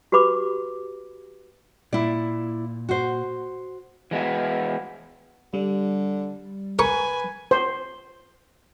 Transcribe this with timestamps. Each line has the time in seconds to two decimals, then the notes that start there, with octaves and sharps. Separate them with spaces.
0.12 F#4 G4 B4 B5 D6
1.93 A#2 E4 D5
2.89 F#4 C5
4.11 E3 G#3 B3 F#4
5.54 D3 G3
6.79 A#4 B4 G#5 C#6
7.51 C5